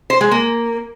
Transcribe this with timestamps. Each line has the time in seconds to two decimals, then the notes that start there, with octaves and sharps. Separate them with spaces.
0.10 C5
0.21 G#3
0.31 A#3